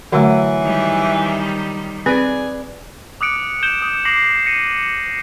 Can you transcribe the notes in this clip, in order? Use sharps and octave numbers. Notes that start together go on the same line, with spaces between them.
D3 E3 F#3 A3
D#3 G3
C4 G#4 B4 D5
D6 D#6 F#6 C#7 D7
G6 E7 G7
D#6
D6 A#6 C7 D7 F#7
A#6 C#7 D#7